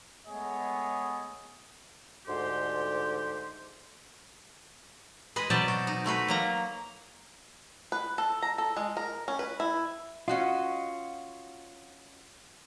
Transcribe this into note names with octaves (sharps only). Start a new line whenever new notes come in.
G#3 A3 B3 G#4 C#5 D#5
D2 G#2 D3 G4 C6
G#3 B4 D#5
B2 F#3 C4 D5 G5 A5
F#4
D#4
G#3 A3 F#4 B4
F#3 A#3 A#5
B4
A4
A#5
A4
G#3
A#4
C#4
B4
E4
C#4 F4 F#4 D#5